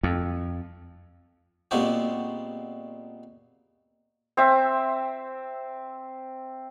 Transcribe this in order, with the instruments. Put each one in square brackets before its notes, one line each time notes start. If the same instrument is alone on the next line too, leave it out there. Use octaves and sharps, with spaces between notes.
[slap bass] F2
[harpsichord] A#2 G#3 B3 C4 F#4 G4
[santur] C4 E5